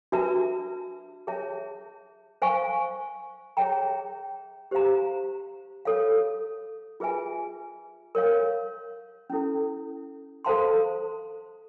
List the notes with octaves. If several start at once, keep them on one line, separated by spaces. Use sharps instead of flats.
D4 F#4 B4 E5 A5
G#4 C#5 E5 A5
C5 F5 G#5 C#6
G#4 C#5 E5 G5 A#5
G4 C5 F5 A#5
A4 C#5 F5
F4 G#4 B4 E5 G#5
A#4 C#5 F5
C#4 E4 A4
A4 C5 F5 A5 C6